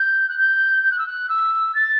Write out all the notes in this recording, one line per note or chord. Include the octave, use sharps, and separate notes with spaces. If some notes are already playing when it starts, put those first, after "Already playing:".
Already playing: G6
F#6
G6
G6
F#6
E6
F#6
E6
A6